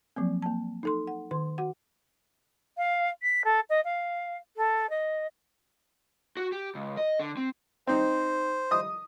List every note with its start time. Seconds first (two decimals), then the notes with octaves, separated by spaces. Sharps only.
0.16 F3 F#3 A#3 C4
0.42 A#3 A5
0.83 D#4 A4 C6
1.07 F#5
1.31 D#3 C6
1.58 F#4 F#5
2.77 F5
3.22 B6
3.44 A4
3.69 D#5
3.84 F5
4.56 A4
4.89 D#5
6.37 F#4
6.52 G4
6.75 C#2
6.97 D#5
7.19 D3
7.37 C4
7.87 C4 D#4 C5
8.71 D#5 D#6